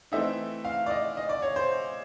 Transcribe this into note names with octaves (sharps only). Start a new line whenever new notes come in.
E3 A3 C4 D#4 E5
F5
D5
D#5
D#5
D5
C#5
C5